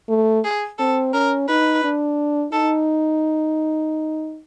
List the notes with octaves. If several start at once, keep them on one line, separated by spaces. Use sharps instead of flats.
A3
G#4
C4 A4
C#4 A#4
D#4 B4
D4
D#4 A4